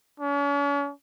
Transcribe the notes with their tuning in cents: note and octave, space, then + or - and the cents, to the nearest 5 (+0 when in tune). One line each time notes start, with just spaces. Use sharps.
C#4 +40